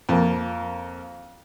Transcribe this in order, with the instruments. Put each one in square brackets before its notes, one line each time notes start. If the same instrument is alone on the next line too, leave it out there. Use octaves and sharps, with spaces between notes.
[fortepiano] F2 A#3